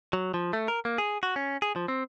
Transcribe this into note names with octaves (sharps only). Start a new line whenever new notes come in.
F#3
F3
A3
A#4
A#3
G#4
F#4
C#4
G#4
F3
C4